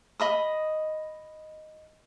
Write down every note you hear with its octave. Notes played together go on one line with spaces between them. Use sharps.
D#5 B5 D#6